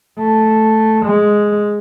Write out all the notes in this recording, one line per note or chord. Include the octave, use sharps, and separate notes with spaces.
A3
G#3